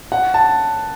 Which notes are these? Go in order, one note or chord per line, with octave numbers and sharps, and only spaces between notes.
F#5
A5